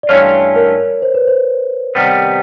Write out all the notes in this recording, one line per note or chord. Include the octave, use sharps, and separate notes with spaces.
D5
G2 E3 A3 C#4 F4 C#5
A#4
C5
B4
C5
C3 D#3 G3 B3